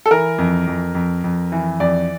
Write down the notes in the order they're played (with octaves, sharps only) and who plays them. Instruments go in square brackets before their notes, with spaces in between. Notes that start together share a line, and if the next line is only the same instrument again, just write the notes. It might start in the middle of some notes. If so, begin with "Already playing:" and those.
[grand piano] A4
E3 A#4
F2
F2
F2
F2
E3
F2 D5